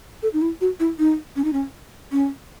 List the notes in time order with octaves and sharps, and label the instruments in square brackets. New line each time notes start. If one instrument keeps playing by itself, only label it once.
[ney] A4
D#4
E4
F#4
E4
D#4
C#4
D#4
C#4
C#4